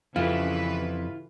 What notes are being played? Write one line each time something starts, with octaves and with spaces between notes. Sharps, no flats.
F2 C#3 E3 E4 F4 G4 B4